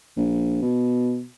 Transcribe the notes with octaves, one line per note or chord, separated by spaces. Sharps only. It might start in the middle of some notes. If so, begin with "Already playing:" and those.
A#1
B2